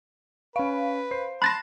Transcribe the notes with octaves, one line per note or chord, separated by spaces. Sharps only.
C#4 B4 F5 C#6
C5 C7
A5 B5 C6 F#6 A6 A#6